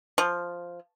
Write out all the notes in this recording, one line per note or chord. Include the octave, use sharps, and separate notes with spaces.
F3